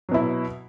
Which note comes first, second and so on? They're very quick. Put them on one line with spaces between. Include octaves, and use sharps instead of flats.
F#3 B2 E4